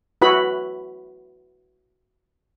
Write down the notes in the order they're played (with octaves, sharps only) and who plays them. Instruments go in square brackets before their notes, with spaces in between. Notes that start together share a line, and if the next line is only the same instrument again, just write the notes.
[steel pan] E4 F#4 B4 B5